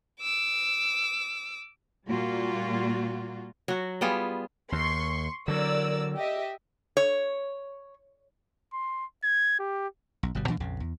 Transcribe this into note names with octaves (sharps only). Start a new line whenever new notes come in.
D6 E6
A#2 G3 A#3 F4 F#4
F#3 F#4
G3 B3 F4 G#4
D#2 C6 C#6
D3 F#3 A#4 D5 E6
G4 D#5 E5
C#5
C6
G#6
G4
B1
G1 B2 G3
A#2 E3 D4
A#1 F2 C#3
E2